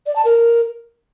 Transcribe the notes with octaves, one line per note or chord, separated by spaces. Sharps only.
D5
A5
A#4